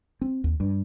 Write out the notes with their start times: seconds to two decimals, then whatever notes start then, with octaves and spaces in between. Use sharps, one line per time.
0.21 C4
0.44 D#2
0.60 G2